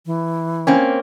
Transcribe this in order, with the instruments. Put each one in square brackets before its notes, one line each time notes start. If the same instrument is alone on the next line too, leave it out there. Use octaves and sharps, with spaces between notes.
[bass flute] E3
[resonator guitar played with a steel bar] A#3 C4 C#4